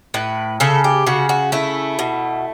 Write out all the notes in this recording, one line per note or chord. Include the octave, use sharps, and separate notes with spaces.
A2 B4
C#3 A4
G4
C#3 F#4
F#4
A3 E4
B2